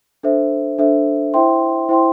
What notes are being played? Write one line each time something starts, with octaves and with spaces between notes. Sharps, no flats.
D4 A4 C5 E5
D4 A4 C5 E5
E4 C5 E5 G5 C6
E4 C5 E5 G5 C6